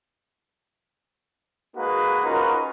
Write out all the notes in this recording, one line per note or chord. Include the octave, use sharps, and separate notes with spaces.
G#3 A#3 D#4 F#4 G#4 B4
C#4 D#4 F4 F#4 A#4 B4